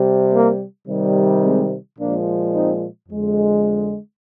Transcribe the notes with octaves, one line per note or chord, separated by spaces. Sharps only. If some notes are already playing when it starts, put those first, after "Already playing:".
Already playing: C3 G3
A#3
C3 D#3 G3
G#3 C4
A#2 F3 G#3 A#3 D4
C4 D#4
F2 D3 G#3